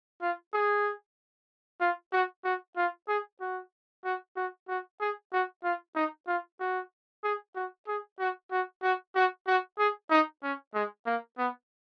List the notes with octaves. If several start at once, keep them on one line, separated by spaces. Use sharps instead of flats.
F4
G#4
F4
F#4
F#4
F4
G#4
F#4
F#4
F#4
F#4
G#4
F#4
F4
D#4
F4
F#4
G#4
F#4
G#4
F#4
F#4
F#4
F#4
F#4
G#4
D#4
C#4
G#3
A#3
B3